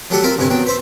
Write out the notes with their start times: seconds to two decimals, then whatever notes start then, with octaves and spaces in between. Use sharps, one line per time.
0.10 F#3 G3 A3 G4 A4 F#5
0.23 C4 F4 A#4 E5 F5
0.38 D2 G2 C3 E4 G#5
0.50 E2 F#3 G5
0.66 B4 C5 E5